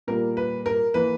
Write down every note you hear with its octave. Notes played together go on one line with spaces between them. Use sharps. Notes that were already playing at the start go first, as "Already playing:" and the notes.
A#2 G3 A#3 A#4
B4
A#4
E3 A#3 B4